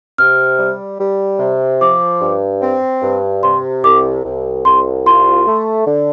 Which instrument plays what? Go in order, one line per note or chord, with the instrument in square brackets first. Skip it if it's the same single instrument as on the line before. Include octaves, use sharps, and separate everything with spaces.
[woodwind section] C3 [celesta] F6
[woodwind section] G3
G3
C3
[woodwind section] F3 [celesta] D6
[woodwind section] G2
C4
G2
[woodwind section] C3 [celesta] C6
[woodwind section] C2 [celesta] D6
[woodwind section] C2
[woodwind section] C2 [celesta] C6
[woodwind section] F4 [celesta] C6
[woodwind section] A3
D3